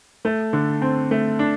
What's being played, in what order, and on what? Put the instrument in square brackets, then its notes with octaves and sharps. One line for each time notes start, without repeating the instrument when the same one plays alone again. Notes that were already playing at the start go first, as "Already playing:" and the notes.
[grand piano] A3
D3
C4
A3
D4